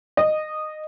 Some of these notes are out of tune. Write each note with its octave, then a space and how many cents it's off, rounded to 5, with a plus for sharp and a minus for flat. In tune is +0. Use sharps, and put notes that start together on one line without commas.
D#5 -15